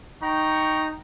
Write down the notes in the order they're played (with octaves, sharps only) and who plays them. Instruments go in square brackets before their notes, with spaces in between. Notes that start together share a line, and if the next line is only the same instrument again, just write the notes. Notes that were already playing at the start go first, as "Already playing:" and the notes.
[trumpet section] D#4 G5 A#5 C#6